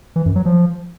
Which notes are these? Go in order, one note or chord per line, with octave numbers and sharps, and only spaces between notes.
E3
F#2
F#3
F3